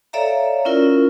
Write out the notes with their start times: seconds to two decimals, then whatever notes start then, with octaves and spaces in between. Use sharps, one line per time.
0.13 A4 C#5 D5 E5 F5 A#5
0.65 C#4 E4 F4 A#4